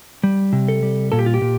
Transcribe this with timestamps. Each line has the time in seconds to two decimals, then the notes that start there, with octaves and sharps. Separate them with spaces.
0.23 G3
0.53 C3
0.68 A4
0.83 G3
1.12 A#2 A4
1.19 G4
1.26 F4
1.34 G4
1.42 A#2